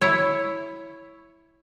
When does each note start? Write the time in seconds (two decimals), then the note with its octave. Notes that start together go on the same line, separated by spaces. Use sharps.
0.01 E4 C#5